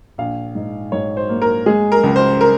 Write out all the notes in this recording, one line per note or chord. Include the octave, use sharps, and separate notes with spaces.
A#1 F5
G#2
G#2 C#5
C5
A#3
A#4
G#3 G#4
A#4
C#2
C5
A#4